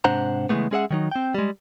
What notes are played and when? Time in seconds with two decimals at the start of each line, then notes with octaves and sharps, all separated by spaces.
0.04 G#2 C3 D4 C5 F#5 A#5
0.49 C#3 E3 F3 G#3 A3 B3
0.71 G#3 C#4 G#4 C#5 E5 F#5
0.91 D#3 F#3 D#4
1.11 C4 G5
1.34 G3 G#3